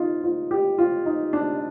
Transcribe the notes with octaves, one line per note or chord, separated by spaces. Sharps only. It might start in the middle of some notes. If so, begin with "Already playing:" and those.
Already playing: D#4 F4
F4
G4
F4
D#4
D4